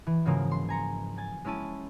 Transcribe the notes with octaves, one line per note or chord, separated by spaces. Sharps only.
E3
G#2 C#3 F3 F#3 G#3 A#3
C6
G#5 A#5 C#7
G#5 A6
G#3 C#4 E4 A5 D#7